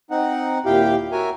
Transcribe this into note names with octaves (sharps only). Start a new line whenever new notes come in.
C4 D#4 F#5
D#2 A#2 E4 G4 F5 G5
F#4 A#4 C#5 E5 G#5